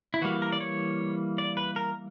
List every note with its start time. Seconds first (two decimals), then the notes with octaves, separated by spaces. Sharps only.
0.14 E4
0.22 E3 G3 A#3 F#4
0.42 A#4
0.52 D5
0.61 C#5
1.38 D5
1.57 B4
1.76 A#4